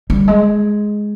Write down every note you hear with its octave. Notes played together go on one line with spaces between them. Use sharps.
G3
G#3